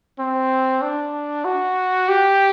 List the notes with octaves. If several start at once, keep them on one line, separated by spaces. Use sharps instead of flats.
C4
D4
F#4
G4